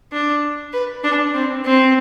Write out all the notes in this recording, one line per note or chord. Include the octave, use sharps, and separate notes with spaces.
D4
B4
D4
C4
C4